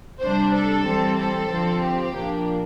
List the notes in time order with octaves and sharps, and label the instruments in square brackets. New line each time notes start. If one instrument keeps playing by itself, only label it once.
[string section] C3 G3 D4 C5
A4
E3 G3 C4
A4
D3 F3 C4
G4
A#2 F3 A#3 D4